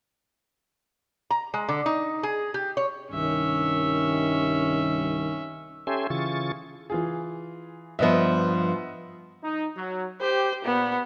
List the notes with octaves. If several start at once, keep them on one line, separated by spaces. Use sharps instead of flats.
A#5
G#3
D3
D#4
G#4
G4
C#5
C2 G2 D#3 C#4 E5
C#4 G4 A4 E5 G#5 C6
C#3 E3 F4 G#4 C#6 A6
E3 F4 G#4
G2 F3 B3 D#5 E5
D#4
F#3
G4 C5
A#2 B3